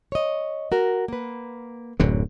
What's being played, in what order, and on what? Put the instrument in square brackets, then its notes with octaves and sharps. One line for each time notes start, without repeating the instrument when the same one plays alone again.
[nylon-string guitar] C#5 D#5
F#4 A#4
A#3 B4
[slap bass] D1 F#2 D3